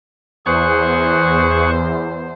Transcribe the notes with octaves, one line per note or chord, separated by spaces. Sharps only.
E2 G#4 C5 C#6 F#6